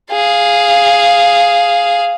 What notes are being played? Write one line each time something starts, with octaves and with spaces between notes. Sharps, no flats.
G#4 F5